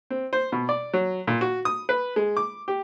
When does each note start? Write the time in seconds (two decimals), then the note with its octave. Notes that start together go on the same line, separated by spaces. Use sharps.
0.10 C4
0.33 C5
0.52 B2
0.69 D5
0.93 F#3
1.27 A#2
1.41 F#4
1.65 D#6
1.89 B4
2.16 G#3
2.37 D6
2.68 G4